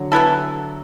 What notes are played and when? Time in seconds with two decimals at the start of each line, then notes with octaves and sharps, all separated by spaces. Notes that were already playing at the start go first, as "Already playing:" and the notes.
Already playing: D3 F#3
0.12 E3 B3 E4 A4